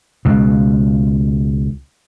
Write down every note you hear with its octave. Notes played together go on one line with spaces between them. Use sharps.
C#2 B2